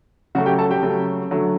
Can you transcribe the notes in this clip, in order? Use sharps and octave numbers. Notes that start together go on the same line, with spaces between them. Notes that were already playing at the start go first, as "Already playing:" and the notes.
C#3 F#3 A3 F#4 F#5
G4 G5
A4 A5
G4 G5
C#3 F#3 A3
D3 F#3 A3